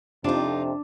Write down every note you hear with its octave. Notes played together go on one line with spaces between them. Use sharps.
F2 C3 D4 D#4 F4